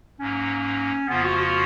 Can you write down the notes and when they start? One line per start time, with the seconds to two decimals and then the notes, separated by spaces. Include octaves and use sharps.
0.20 G#2 F#3 A#3 C#4
1.08 F2 C#3 F3 A#3 B3 F4
1.24 F#4
1.38 F#4